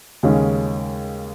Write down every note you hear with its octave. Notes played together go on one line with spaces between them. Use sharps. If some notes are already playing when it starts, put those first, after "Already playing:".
D#2 C#3 G#3 C#4